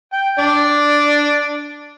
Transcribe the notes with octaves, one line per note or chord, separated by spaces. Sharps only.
G5
D4 D5